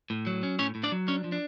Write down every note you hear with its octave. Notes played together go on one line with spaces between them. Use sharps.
A2
F#3
C#4
A2 C#4 C#5
A2
D4 D5
F#3
C#4 D4 C#5
F3
D4